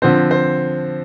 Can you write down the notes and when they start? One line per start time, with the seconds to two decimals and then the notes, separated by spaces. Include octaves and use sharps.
0.02 D3 F3 C4 C5
0.31 C5